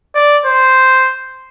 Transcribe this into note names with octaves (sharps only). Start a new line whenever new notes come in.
D5
C5